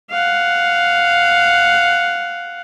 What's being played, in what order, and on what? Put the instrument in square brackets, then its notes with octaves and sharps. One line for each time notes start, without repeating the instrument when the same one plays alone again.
[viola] F5 F#5